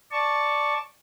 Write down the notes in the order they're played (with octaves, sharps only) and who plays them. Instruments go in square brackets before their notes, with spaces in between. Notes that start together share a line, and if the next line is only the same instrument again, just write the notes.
[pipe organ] D5 A5 C#6